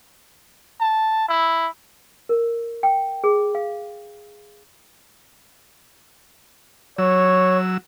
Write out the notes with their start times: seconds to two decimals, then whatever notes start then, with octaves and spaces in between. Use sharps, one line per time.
0.80 A5
1.29 E4
2.29 A#4
2.83 G5
3.24 G#4
3.55 F5
6.98 F#3 C#5 E6